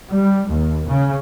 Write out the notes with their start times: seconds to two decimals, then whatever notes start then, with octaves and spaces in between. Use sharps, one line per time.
0.11 G3
0.48 D#2
0.87 C#3